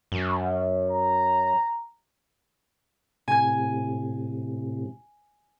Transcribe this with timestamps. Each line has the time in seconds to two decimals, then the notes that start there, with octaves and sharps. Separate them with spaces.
0.12 F#2
0.91 A#5
3.28 A2 C3 G#5 G#6